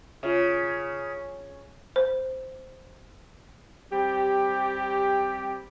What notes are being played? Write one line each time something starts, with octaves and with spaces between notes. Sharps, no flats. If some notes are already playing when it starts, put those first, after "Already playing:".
C#3 F4 C#5 E5
C5
G3 C4 G4